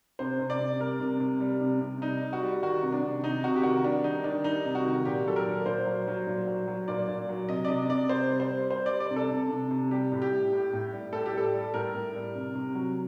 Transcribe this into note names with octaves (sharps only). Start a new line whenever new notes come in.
C3 C5
C3
D5
C3
G3 A#4
C3
C3
G3
C3
C3
G3 D#4
G3
F#4
G3
D#3 F#4
C3
D4
C3
C3 D#4
C3 F#4
G4
D#3 F#4
G3 D4
D#3 D#4
D#3 D4
G3 D#4
C3
F#4
D#3
A#2 G4
F#3 A4
A#4
A#2
A#2 C5
F#3
F#3
A#2
F#3
F#3
A#2 D5
A#2
F#3
C3 D#5
D5
C3 D#5
C3 D5
C3 C5
G3
C5
G3
G3 C5
G3 D5
D5
C3
A4
C3
C3
C3
G3 G4
A2
G4
G3
A2
A2
G3
A2 A4
G4
G3 A4
G3
A2 A#4
A2
G3
C3
C3
F#3